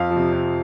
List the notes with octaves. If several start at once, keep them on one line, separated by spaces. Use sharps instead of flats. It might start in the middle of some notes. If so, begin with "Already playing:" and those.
Already playing: F2 F5
F3
C3
F2